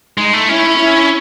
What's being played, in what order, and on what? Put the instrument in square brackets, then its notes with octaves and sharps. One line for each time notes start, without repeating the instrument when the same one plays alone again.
[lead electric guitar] G#3 [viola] D#4
[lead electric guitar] A3
[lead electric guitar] C#4 [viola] E4
[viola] E4